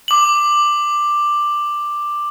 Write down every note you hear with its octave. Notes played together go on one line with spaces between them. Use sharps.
D6 F#7